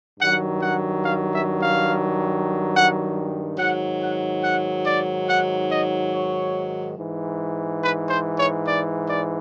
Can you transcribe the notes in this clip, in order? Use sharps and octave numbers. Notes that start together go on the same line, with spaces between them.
G2 D#3 F#3 F#5
F#5
F5
E5
F5
F#5
G#2 D#3 F#3 F#5
F#5
F#5
D5
F#5
D#5
C#5
G#2 E3
B4
C5
C#5
D5
D5